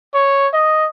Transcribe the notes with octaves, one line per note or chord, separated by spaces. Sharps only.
C#5
D#5